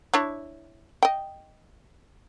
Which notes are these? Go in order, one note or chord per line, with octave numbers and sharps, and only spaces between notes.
D4 E4 C#5
D#5 G5